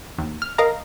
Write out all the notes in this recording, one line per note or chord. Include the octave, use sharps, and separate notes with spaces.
D#2
F6
A#4 D#5 F5 A#5